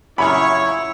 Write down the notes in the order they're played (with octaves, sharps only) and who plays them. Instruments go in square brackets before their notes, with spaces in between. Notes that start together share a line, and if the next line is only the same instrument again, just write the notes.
[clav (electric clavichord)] F#2 A#2 C#3 [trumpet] E4 [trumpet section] C#5 [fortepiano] B5